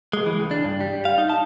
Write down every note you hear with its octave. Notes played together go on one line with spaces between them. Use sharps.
G#3
E3
C#2
D4
G2
G3
F5
D#4
A5